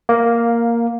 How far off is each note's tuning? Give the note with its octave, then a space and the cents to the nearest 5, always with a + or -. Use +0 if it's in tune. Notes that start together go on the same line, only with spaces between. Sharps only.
A#3 +0 F5 +15